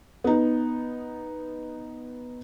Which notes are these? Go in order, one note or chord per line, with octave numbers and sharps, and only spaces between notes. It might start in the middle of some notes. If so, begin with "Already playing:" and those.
B3 D#4